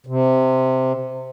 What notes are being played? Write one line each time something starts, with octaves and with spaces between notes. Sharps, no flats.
C3